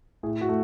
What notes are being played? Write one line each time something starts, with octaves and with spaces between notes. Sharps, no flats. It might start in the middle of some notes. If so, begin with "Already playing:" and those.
A2 G#4
F#4
A3